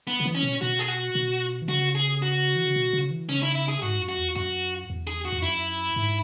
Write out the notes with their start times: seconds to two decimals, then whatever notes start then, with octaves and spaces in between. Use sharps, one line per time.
0.07 B3
0.20 C#3
0.26 E3
0.35 C#4
0.43 B2
0.61 B2 F#4
0.79 G#4
0.88 F#4
1.15 B2
1.62 E3
1.68 C#3 F#4
1.95 G#4
2.22 F#4
2.56 E3
2.65 C#3
2.76 B2
2.93 C#3
3.11 E3
3.29 C#3 C#4
3.42 E4
3.55 E4
3.68 G#4
3.82 G#2 F#4
4.00 F#2
4.09 F#4
4.18 E2
4.36 F#2 F#4
4.90 E2
5.07 G#4
5.25 F#4
5.32 E2
5.42 F#2 E4
5.96 G#2